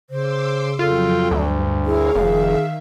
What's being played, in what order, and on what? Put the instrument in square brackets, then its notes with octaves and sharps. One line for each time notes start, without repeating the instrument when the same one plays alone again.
[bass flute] C#3 [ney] C5 [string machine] C6 D6 E6
[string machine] F2 F#3 G5 [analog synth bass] F4 [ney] A4
[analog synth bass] D2 [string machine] G2
[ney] E4 [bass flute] G#4 [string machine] A#4 C#5 F5
[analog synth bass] F1 [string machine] D#3 E5 [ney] F5